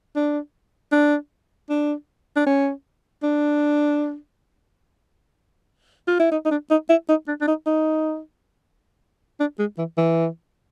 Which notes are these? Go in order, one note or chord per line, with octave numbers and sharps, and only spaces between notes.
D4
D4
D4
D4
C#4
D4
F4
E4
D#4
D#4
D4
D#4
E4
D#4
D4
D4
D#4
D#4
D4
G#3
E3
E3